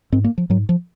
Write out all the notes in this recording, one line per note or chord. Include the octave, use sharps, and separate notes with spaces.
G#2 C4
A#3
F3
G#2 F#3
F3